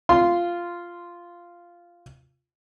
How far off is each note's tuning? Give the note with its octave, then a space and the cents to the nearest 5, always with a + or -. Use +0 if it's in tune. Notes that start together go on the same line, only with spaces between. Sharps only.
F4 -5 C6 -10